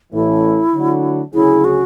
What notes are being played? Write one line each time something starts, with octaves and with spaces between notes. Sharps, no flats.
A1 A2 E3 A3 E4
D3 F#3 A3 D4 F#4
D2 C#3 F#3 C#4 E4 G#4
F#4